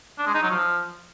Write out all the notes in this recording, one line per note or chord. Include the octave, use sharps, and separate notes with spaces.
D4
G#3
D#4
F#3
F3